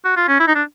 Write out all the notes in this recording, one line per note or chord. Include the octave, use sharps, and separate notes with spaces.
F#4
F4
C#4
E4
D#4
D4